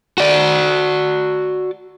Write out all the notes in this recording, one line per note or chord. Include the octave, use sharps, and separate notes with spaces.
F#4 D5